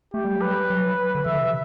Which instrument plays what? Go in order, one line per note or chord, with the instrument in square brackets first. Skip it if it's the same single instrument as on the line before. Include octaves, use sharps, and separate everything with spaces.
[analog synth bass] A3 [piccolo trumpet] G4
[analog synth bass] G3
F#3
[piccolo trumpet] B4
[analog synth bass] G3
F#3
D3
[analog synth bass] E3 [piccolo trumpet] E5
[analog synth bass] D3
C3